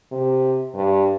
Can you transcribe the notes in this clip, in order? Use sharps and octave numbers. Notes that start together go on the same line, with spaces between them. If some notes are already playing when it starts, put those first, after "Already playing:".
C3
G2